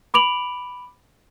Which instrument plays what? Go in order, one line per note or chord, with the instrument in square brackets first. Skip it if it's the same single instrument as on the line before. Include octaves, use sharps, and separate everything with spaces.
[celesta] B5 D6 D7 F7 F#7